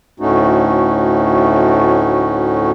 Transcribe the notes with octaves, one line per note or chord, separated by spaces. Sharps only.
D2 A2 A3 C#4 D#4 F#4